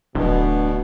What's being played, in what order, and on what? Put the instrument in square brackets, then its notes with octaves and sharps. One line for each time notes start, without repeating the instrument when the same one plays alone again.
[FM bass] D1 [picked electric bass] D2 D3 [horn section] B2